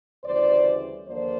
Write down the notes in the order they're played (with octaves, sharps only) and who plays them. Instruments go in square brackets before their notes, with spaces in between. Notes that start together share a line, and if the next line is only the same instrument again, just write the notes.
[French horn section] D2 C#3 E3 G3 C5 D5
D#2 D3 F3 A#3 C5 D5